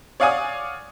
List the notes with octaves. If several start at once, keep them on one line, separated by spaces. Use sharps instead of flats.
C#5 D5 F5 F#5 G#5 D#6